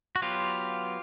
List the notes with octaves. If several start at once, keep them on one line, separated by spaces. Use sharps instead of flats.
F#4
F#3 B3 F4 G4